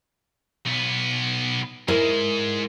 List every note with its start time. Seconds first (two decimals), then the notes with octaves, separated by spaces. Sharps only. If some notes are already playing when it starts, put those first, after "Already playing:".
0.65 B1 B3
1.88 G#2 G#3 E4 A#4 C5